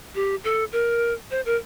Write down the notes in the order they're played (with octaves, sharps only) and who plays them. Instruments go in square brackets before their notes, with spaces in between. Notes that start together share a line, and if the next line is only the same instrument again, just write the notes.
[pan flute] G4
A4
A#4
C5
A#4